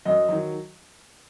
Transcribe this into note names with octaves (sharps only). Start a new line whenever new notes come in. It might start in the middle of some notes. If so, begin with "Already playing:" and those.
F#2 D#5
D#3 F#3